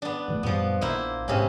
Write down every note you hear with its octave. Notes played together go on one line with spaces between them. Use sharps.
B3 D4
G2 E3 A3
F#2 A#2 F3 G3 B3
A#1 A#3 E4 C5
G#2 C3 B3 C#4